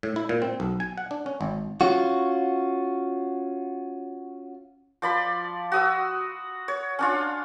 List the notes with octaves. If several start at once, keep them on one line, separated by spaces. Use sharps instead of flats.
A2
E4
A#2
C4
B1
G#5
F#5
D4
C#4
G#1
C#4 F4 F#4
F3 D5 B5 C6
F#4 D#6 E6
C#5
C#4 D4 F4